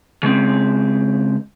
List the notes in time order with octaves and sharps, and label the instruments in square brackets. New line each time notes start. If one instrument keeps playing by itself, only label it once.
[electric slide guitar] C#3 G#3 C4